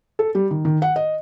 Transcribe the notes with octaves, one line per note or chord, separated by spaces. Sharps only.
A4
G3
D#3
D#3
F#5
D#5